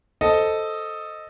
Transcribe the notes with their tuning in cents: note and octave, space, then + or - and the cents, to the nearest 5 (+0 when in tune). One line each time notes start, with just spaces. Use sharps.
A4 +0 C5 +0 D#5 +0